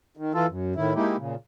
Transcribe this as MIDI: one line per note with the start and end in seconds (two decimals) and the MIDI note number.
0.17 0.32 51
0.34 0.47 52
0.34 0.47 65
0.34 0.47 69
0.49 0.74 42
0.76 0.93 45
0.76 0.93 51
0.76 0.93 64
0.95 1.16 56
0.95 1.16 58
0.95 1.16 63
0.95 1.16 64
0.95 1.16 67
1.18 1.35 46
1.18 1.35 49